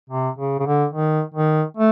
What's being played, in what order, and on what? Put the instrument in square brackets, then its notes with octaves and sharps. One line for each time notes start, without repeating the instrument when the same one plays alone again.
[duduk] C3
C#3
C#3
D3
D#3
D#3
A3